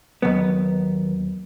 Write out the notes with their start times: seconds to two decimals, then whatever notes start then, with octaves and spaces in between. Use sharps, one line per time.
0.22 D#2 F#3 B3